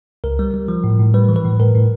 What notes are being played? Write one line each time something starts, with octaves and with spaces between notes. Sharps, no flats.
C#2 A#4
G3
G3
F3
A2
A2
G3 B4
E3
B4
A2
A2 A#4
A2